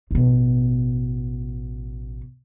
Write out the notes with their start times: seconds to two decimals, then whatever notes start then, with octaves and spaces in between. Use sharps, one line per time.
0.11 A1 B2